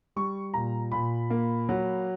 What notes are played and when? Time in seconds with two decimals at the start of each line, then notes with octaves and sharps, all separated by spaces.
0.16 G3 C#6
0.54 A#2 A#5
0.92 A#2 B5
1.30 A#3
1.69 F#3